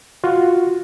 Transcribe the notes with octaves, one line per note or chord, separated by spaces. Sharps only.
F4 F#4